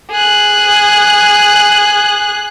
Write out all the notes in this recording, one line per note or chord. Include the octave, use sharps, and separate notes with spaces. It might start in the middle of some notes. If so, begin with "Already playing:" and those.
G#4 F#6